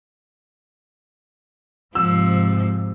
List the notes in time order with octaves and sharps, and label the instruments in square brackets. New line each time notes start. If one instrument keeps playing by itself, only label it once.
[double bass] G#2 C3 [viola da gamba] F3 [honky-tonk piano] E6